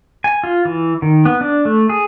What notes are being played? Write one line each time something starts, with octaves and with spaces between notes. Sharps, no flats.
G#5
F4
E3
D#3
B3
D4
A3
G#4